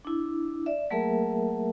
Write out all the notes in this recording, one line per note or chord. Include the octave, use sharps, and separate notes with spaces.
D4 E4
D5 E5
F#3 A3 A#3 G#4 A#4 E5